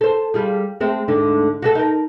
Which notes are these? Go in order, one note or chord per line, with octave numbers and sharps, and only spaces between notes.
A4 C5
G3 F4 G#4
G#3 A3 C4
D2 G#2 D3
F#4 G4 A4
D#4 A#4